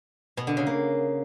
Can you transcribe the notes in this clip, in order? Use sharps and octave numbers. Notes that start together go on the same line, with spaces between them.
B2
D3
C#3
A#3